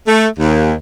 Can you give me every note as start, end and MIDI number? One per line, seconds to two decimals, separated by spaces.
0.08 0.26 57
0.39 0.73 39